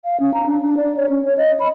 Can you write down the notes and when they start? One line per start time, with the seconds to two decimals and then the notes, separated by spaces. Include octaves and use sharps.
0.05 F5
0.20 C#4
0.34 A#5
0.46 D4
0.63 D4
0.77 D5
0.97 C#5
1.09 C#4
1.25 C#5
1.38 D#5
1.60 B5